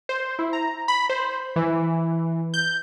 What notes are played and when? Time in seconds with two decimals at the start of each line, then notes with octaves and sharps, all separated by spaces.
0.09 C5
0.39 E4
0.53 A#5
0.88 B5
1.09 C5
1.56 E3
2.54 G6